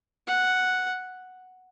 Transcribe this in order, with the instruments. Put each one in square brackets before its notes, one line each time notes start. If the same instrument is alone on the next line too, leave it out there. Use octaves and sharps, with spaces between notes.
[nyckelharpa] F#5